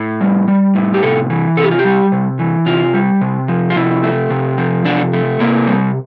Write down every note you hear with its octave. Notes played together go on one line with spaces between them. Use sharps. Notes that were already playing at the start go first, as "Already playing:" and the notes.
Already playing: A2
G3
G3
A2
G4
C3 A4
E3
C3 A4
G4
F4
G4
G3
C3
E3
C3 F4
G3
C3
F3
F4
C3 E4
A3
C3
F3
C3 D4
A3
C3 A#3
G3